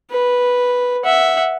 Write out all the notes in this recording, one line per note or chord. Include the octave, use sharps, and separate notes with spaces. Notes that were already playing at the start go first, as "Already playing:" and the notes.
B4
E5 F#5